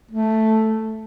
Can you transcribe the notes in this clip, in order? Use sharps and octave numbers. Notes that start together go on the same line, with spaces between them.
A3